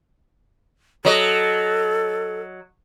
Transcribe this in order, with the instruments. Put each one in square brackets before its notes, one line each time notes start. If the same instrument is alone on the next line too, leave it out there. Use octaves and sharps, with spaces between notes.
[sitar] F#3 D#5 [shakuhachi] A4